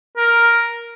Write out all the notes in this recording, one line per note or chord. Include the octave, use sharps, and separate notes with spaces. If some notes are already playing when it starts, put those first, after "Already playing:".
A#4